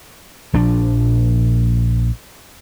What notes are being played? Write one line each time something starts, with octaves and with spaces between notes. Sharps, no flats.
A#1 F3 D4